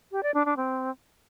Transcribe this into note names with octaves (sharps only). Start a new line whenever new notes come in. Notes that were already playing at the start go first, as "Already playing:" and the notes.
G4
D5
D4
D4
C4